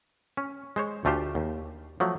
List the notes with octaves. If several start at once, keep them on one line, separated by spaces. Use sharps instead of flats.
C#4
G#3 C5 C#5
D2 A3 F4 G4 C5
D#2
F3 F#3 A3